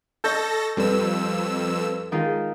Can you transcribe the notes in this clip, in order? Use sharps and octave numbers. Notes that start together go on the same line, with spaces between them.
A4 D#5 C#6 G6 A#6
F2 G3 A4 B4 E6
D#3 G#3 D#4 F4 G#4